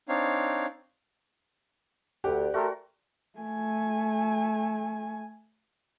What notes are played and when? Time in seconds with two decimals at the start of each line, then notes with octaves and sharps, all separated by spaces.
0.09 C4 D4 D#4 C#5 F5
2.24 D2 G4 D5 F#5
2.54 A3 F#4 A4 A#4 C5 G5
3.39 A3 G#5